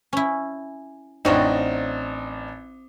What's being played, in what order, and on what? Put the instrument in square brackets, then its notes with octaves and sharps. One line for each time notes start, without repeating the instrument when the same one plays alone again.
[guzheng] C#4 E4
[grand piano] A1 D4 D#4 [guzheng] C4 F#4 C#5